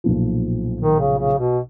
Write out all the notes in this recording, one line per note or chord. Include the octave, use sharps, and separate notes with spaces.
B1 A#2 F3
D#3
C#3
C#3
B2